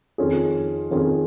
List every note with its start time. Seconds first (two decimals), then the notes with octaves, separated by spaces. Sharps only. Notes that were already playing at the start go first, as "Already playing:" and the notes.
0.18 F2 D#3 C#4 F4 G#4
0.90 F2 D#3 C#4 F4 G#4